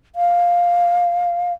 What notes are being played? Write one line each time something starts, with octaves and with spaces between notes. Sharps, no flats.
F5